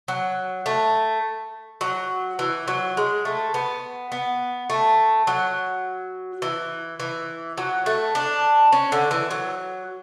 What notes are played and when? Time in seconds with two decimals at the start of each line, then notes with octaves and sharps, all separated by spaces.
0.08 F#3
0.66 A3
1.81 F#3
2.39 E3
2.68 F#3
2.97 G#3
3.25 A3
3.54 B3
4.12 B3
4.70 A3
5.27 F#3
6.42 E3
7.00 E3
7.58 F#3
7.86 A3
8.15 D4
8.72 C#4
8.92 D3
9.11 E3
9.31 F#3